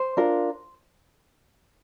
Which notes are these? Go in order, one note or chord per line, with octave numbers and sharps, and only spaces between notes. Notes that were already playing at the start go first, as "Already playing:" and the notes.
Already playing: C5
D4 F4 A#4